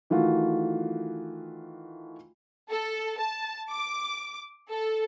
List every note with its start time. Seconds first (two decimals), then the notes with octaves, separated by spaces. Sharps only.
0.10 D#3 E3 A3 F4 F#4
2.69 A4
3.18 A5
3.70 D6
4.69 A4